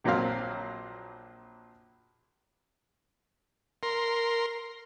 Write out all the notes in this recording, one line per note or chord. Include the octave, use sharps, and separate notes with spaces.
A#1 A#2 F#3 C4 F5
A#4 C6